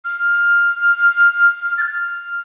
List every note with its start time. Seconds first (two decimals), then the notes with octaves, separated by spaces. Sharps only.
0.05 F6
1.78 A6
1.82 F6